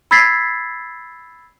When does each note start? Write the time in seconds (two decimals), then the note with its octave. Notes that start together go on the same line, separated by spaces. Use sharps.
0.11 B5 E6 G#6 A6 B6 C7